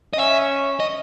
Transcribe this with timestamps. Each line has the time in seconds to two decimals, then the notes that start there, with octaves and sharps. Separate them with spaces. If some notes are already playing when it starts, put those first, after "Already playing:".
0.13 D#5
0.18 C#4 E5
0.80 D#5